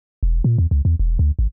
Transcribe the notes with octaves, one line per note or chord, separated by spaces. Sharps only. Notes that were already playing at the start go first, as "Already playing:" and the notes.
E1
A#2
E2
C#2
E2
E1
D2
G#1